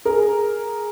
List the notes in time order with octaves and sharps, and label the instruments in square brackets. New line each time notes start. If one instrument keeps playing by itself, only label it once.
[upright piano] G#4 A#4